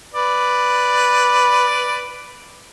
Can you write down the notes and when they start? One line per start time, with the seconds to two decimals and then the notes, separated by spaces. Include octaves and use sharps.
0.14 B4 D5